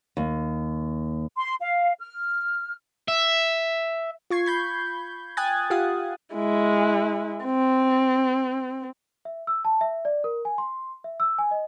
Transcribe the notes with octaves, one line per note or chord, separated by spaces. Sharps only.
D#2
C6
F5
F6
E5
F4 C#6 G#6 C7
B5 G6 G#6
G5 G#5 D#6 F#6 G#6 A6
F4 G4 F5 F#5 D#6
G#3 E4
C4
E5
E6
A5
E5
D5
A#4
G#5
C6
E5
E6
G#5
D#5